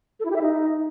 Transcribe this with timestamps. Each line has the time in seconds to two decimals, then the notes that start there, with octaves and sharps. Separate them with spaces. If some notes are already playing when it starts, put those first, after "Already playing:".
0.20 A4
0.25 E4
0.31 G4
0.36 E5
0.41 D#4